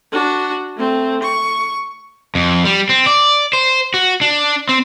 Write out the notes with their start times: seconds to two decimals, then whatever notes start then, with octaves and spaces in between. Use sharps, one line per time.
0.12 D4 F#4
0.76 A3 C4
1.22 C#6
2.35 F2
2.65 G3
2.89 C4
3.06 D5
3.53 C5
3.94 F#4
4.21 D4
4.69 C4